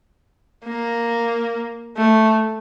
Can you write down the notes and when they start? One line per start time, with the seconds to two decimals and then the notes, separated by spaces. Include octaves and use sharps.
0.65 A#3
1.97 A3